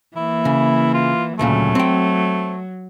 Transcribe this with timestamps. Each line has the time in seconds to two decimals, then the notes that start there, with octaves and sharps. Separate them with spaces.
0.16 E3 A#3 E4
0.45 C#3
0.94 F4
1.39 D2 A#2 C#3 F#3 A3
1.75 C4 G5